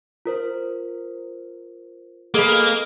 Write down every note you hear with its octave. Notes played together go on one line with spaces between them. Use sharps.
F4 A#4 C5
A#3 G#4 A4 B4 D#5